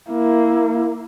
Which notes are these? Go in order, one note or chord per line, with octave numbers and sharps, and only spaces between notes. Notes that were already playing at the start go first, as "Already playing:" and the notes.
A#3 E4